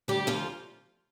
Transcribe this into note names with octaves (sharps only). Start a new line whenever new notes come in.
D2 G3 G4
D2 F3 F4